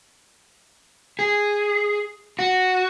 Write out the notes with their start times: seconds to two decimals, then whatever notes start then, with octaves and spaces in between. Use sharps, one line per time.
1.19 G#4
2.39 F#4